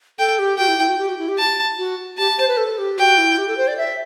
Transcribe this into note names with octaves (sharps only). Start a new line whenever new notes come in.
A4 G5
G4
F#4 G5
E4
E4
F#4
G4
F#4
E4
G4
A5
F#4
G4 A5
C5
B4
A4
G4
F#4 G5
E4
G4
A4
C5
D5
E5